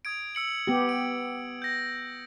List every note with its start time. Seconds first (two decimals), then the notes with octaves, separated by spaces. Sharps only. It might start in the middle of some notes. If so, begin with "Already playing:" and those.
0.05 D#6 G#6 D7
0.35 E6 C#7 F#7
0.67 B3 G4
0.89 D7
1.62 G6 A#6